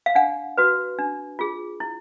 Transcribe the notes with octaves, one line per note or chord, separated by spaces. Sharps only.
F5
D4 F#5
F#4 B4
D4
F4 G#4
E4